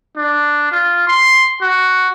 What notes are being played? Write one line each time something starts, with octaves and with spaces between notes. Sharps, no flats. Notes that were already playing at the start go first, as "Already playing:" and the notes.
D4
F4
C6
F#4